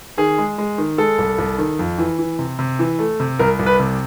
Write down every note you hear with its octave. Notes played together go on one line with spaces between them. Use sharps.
D#3 G#4
G#3
G#3
D#3
G#3 A4
C2
C2
D#3
F2
E3
E3
C3
C3
E3
A3
C3
C2 A#4
C2
B4
C3